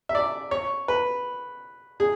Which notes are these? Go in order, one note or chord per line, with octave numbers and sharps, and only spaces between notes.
E5
D5
C#5
B4
G#4